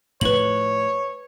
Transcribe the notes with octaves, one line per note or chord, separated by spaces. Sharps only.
A2 F3 B4 C#5 F#7